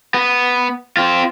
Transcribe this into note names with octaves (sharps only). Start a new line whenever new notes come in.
B3
C4 F4